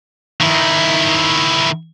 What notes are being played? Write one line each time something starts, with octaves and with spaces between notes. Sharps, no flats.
D#3 E4